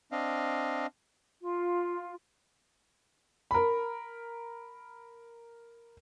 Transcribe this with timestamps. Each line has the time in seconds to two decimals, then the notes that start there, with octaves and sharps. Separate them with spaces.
0.12 C4 D4 D#5 F5
1.41 F4
3.51 A#4 B5